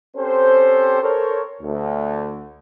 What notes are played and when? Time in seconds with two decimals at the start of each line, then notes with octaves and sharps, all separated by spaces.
0.17 C4 C#4 G4 A4 C5
1.02 A4 A#4 C5 C#5
1.62 D2